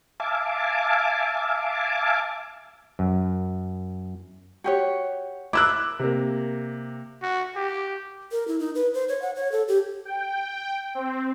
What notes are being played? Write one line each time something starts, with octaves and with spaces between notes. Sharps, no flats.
E5 F5 G#5 A5 D6
F#2
F#4 G4 C#5
E4 A#4 D6 E6 F#6
C3 A#3
F#4
G4
A#4
E4
D#4
B4
C5
C#5
F#5
C#5
A4
G4
G5
C4